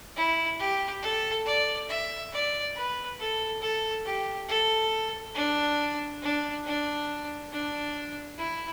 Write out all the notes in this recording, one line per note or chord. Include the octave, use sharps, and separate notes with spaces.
E4
G4
A4
D5
E5
D5
B4
A4
A4
G4
A4
D4
D4
D4
D4
E4